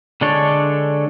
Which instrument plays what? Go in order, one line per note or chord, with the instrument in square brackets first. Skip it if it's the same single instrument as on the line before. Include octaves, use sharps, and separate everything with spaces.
[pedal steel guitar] D3 G#3 D4 A4 C#5